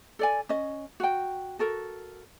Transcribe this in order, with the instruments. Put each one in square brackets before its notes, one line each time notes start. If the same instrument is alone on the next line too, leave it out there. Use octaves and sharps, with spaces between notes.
[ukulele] A4 D5 G#5
C#4 D#5
F#4 G5
F#4 A4 A#4